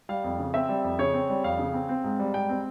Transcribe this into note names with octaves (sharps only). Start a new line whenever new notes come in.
G3 F5
F2
C#3
C4 E5
G3
F2
C#3 C#5
C4
G3
F2 F5
C#3
C4
C4
G#2
G3
G#2 G5
C4